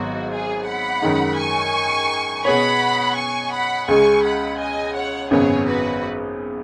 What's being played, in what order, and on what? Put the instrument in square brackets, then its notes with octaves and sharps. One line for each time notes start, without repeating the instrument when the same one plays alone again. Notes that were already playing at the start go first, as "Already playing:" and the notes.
Already playing: [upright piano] G#1 G#2 F#3 B3 [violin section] F#4
[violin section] G#4
F#5 B5
[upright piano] F#2 D#3 G#3 D#4
[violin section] G#5 C#6
[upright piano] B2 B3 G#4 C#5 [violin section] F#5 B5
[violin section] G#5 C#6
F#5 B5
[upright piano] C#2 C#3 G#3 [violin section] G#5 C#6
[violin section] F#5 B5
D#5 G#5
C#5 F#5
[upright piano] G#1 F#2 C#3 B3 [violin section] G#4 C#5
[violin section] F#4 B4